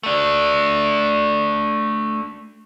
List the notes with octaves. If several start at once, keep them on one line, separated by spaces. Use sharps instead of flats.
A3 D4